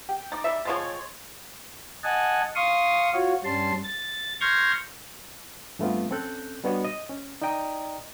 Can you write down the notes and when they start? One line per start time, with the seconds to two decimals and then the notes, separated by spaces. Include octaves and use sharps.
0.09 G4
0.32 D#4 D6 A6
0.44 G3 D#4 E5
0.65 F3 G#3 C4 C#5 C6 A6
2.04 D#5 F#5 G#5 A5
2.55 F5 C6 C#6 D#6
3.13 F4 F#4 C#5
3.45 G2 G3 C#4 A5 C6
3.84 A6
4.41 C6 C#6 F6 G6 G#6 A#6
5.79 G2 F3 A3 B3 C4 F4
6.11 C4 C#4 A4 F#6 G6
6.64 G3 B3 D4 F#4 C#5 D#5
6.84 D#5
7.09 C#4
7.42 D#4 D5 D#5 G5 A#5 D#6